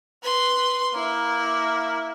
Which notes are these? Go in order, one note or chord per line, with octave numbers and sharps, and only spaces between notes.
B4 C6
A#3 E4